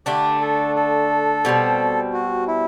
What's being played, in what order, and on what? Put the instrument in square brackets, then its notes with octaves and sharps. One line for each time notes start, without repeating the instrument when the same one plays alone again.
[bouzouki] D3 A3 D4 [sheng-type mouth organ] G4
[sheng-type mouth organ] A4
A4
[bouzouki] B2 G3 C4
[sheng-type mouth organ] F#4
E4